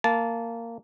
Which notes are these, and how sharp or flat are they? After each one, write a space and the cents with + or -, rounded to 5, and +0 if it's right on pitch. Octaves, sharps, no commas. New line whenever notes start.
A#3 -15 A5 -15